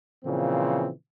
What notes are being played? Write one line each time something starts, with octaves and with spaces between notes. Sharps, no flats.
A#2 C#3 E3 F3 C4